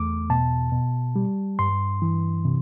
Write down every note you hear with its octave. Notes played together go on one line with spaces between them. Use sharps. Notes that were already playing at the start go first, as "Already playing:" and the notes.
Already playing: E2 A3 D6
B2 A5
B2
G3
G2 C6
E3
C3